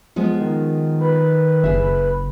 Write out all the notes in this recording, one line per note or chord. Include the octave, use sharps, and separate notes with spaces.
F3 G#3 B3
D#3
B4
F#1 G#4 E5